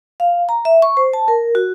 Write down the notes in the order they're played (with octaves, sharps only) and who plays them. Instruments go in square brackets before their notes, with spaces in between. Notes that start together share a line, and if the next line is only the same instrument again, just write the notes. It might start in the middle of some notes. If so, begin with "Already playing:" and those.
[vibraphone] F5
A#5
E5
C#6
C5
A5
A#4
F#4